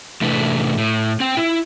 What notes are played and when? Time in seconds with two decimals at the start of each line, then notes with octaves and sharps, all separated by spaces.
0.21 A2 C3 E3 A3 D4 B4
0.78 A2
1.20 C4 G5
1.37 E4